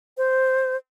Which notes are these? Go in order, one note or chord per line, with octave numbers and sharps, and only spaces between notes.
C5